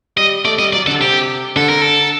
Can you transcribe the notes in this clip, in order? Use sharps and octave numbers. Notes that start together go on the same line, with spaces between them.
G3 D#5
A3 D5
G3 D#5
F#3 D5
D3 A4
C3 G4
D3 A4
A#4
A4